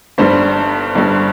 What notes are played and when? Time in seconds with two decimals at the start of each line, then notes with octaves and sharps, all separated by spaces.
0.18 G1 G2 G3 C5
0.95 G1 G2 G3